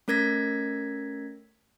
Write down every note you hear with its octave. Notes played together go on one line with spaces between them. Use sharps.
A3 C#4 A#4 G#6 A#6 B6